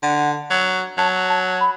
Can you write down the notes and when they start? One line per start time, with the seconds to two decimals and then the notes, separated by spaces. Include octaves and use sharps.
0.03 D3 F#5
0.50 F#3
0.98 F#3 A5
1.30 A5
1.61 B5